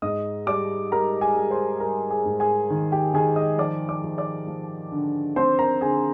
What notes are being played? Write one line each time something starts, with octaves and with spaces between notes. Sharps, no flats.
G#2 D#5 D#6
G3 D5 D6
G3 A#4 A#5
G#4 G#5
G3
C5 C6
G3 A#4 A#5
G#4 G#5
G#2
G#4 G#5
D#3
G4 G5
D#3 G#4 G#5
D#5 D#6
F3 D5 D6
D5 D6
F3
D5 D6
F3
D3
C4 C5 C6
A#4 A#5
D3 G#4 G#5